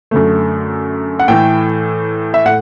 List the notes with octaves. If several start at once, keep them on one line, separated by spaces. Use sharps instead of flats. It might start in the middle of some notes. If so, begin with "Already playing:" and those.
F#2 D3 A3
F#5
A2 E3 A3 G5
E5
A2 F#5